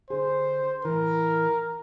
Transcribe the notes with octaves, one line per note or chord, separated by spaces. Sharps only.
D3 G#4 C5
A2 E3 A#4